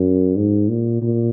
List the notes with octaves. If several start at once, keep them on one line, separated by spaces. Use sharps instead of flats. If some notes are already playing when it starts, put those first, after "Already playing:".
Already playing: F#2
G#2
A#2
A#2